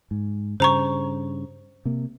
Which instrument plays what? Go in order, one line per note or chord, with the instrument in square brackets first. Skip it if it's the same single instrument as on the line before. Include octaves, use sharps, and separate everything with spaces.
[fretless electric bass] G#2
[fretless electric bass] G2 C#3 [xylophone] C5 A#5 C#6
[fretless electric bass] C3 A#3